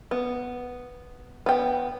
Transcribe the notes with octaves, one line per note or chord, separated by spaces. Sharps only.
B3
B3 G5